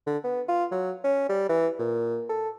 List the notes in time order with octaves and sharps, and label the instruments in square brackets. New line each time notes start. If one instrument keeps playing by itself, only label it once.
[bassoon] D3
B3
F4
F#3
C#4
G3
E3
A#2
A4